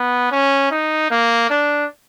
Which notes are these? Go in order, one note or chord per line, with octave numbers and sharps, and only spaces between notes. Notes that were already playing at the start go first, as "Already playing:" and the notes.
Already playing: B3
C#4
D#4
A#3
D4